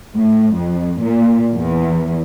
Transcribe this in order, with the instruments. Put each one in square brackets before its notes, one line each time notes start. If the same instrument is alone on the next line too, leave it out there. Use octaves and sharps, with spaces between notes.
[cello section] A2
F2
A#2
E2